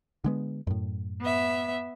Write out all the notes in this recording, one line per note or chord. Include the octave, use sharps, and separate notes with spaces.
D3 G#3 B3
F#2 A2
B3 E5